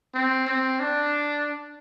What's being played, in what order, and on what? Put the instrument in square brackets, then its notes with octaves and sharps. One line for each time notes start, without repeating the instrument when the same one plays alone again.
[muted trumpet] C4
C4
D4